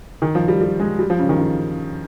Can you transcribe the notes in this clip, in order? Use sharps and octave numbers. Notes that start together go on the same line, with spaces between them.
D#3
F3
G3
G3
G#3
G3
F3
C#3
D#3
C#3